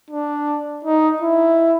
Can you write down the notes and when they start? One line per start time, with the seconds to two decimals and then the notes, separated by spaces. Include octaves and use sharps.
0.10 D4
0.85 D#4
1.22 E4